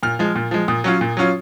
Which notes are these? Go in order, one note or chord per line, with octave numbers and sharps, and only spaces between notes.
A#2 F6
F3 G#3
A#2
F3 G#3
A#2 D#6
F#3 C#4 F4
A#2
F#3 C#4 F4